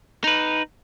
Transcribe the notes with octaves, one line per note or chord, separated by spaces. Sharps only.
D#4 B4